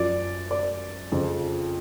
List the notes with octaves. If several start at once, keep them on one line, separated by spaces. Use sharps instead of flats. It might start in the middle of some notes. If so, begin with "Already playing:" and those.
Already playing: F#2 F3 D5
D5
F2 C#3 F3